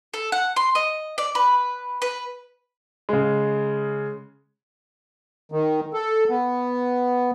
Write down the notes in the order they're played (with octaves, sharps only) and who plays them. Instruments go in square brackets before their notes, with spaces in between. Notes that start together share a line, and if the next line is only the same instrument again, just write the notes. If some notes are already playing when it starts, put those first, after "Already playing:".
[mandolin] A4
F#5
C6
D#5
D5
B4
B4
[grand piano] C#3 G#3
[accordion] D#3
A4
B3